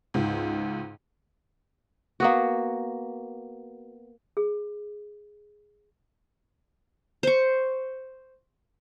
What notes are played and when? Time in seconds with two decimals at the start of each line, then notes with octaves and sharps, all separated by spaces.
0.14 C#2 G#2
2.20 A#3 B3 F#4
4.37 G#4
7.23 C5 C#6